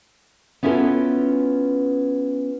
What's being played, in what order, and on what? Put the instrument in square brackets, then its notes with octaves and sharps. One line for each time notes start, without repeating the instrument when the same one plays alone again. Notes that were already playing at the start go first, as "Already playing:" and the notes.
[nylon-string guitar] B3 C#4 E4 F4 A4 B4